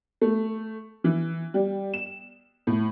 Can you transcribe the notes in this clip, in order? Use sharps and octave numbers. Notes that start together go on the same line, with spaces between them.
A3
E3
G3
E7
A2